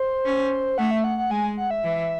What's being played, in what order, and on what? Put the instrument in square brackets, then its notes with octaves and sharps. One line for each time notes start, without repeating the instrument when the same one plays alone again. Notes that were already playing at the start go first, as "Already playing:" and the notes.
Already playing: [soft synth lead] C5
[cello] C#4
[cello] A3 [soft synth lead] F#5
[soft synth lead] E5
F#5
F#5
[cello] G#3 [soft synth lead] G#5
[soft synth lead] F#5
E5
[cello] E3